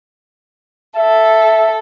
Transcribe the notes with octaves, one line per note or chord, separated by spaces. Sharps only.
A4 E5